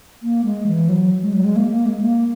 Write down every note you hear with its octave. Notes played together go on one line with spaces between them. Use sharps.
A#3
G#3
E3
F#3
G#3
F#3
G#3
A#3
A#3
G#3
A#3